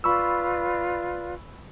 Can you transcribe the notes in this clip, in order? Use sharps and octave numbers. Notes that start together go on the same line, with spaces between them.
F4 B4 D5 B5 C#6 E6